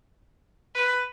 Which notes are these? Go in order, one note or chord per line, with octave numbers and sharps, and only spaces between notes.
B4